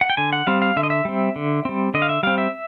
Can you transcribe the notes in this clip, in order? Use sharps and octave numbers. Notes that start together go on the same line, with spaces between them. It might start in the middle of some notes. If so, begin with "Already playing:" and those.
F#5
G5
D3 G#5
F#5
G3 C4 F5
F5
D3 E5
D#5
E5
G3 C4
D3
G3 C4
D3 D#5
F5
E5
G3 C4 F5
E5